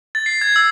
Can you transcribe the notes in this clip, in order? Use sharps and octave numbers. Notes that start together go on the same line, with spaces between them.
A6
C7
G#6
E6